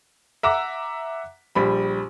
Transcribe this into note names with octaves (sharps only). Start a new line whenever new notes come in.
E5 F#5 A#5 D6 E6
A#1 G3 B5